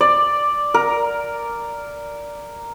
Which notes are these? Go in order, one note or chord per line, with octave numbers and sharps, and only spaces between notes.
D5
A#4